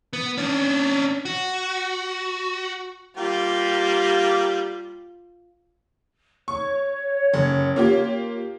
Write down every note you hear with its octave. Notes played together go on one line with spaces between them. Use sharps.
B3
C#4 D4
F#4
G3 A#3 F4 G4
C#5 C#6
F#1
A#3 F4 G4